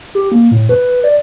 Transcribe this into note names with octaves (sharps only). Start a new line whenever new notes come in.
G4
A#3
A2
B4
D5